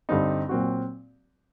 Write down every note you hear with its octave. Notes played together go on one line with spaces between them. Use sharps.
G2 D3 G3 C4 D#4
A#2 F#3 C4 F#4